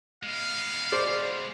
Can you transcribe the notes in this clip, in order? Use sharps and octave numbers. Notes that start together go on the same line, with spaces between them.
G#3 B3 F5
G#4 C5 D5 C7